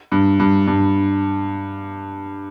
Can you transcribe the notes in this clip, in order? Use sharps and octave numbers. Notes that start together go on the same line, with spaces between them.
G2
G2
G2